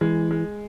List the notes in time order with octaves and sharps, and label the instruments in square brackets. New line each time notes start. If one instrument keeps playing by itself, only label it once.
[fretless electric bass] E3 [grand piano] G#3
[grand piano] G#3